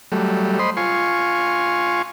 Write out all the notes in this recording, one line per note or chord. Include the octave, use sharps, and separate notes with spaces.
F#3 G3 A3
C5 D#5 B5 C6
F4 G#5 C6 C#6